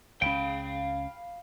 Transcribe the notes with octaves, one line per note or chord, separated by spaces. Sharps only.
C#2 C#4 F5 G5 B5